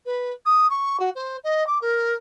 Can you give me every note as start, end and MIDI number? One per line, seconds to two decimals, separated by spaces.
0.06 0.31 71
0.45 0.67 87
0.70 0.99 85
1.00 1.10 66
1.15 1.37 72
1.44 1.66 75
1.67 1.78 86
1.82 2.14 70